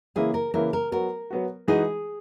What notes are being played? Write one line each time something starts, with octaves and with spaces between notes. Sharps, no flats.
C#3 E3 A#3 E4 G#4
A#4
C#3 E3 A#3 E4 A#4
A#4
F#3 B3 F#4 A#4
F#3 B3 F#4
E3 G#3 D#4 F#4 G#4